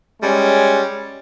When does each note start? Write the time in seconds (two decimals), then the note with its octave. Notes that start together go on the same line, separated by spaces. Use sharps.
0.22 G3 G#3 C#4